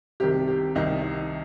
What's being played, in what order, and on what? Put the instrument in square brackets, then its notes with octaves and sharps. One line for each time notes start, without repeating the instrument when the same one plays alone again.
[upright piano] C2 C3 D#3 G4
G4
C2 C3 D#3 D#4